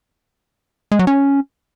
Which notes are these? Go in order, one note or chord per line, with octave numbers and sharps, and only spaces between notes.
G#3
F#3
C#4